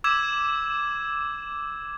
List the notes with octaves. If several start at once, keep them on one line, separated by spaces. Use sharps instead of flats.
D6 E6 G#6 E7